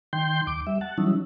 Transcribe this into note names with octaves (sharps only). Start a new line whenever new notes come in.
D#3 G5 C6 G6
D#2 D6
G3 E5
F#5 A5
E3 F#3 G3 C#4 D#4 E4